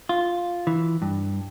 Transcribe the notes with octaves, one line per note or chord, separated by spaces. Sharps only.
F4
E3
G2